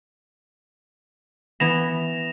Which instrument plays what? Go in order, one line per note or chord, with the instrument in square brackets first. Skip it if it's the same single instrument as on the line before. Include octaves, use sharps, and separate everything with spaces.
[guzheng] E3 B3 B5 [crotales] A#6 E7 F7